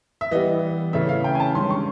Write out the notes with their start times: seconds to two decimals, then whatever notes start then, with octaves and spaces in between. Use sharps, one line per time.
0.21 E5
0.31 E3 G3 B3 D#5
0.93 C#3 E3 A3 C#4 E4 E5
1.09 F5
1.24 G5
1.35 G#5
1.40 A5
1.55 G2 D#3 G#3 C#4 C6
1.70 C#6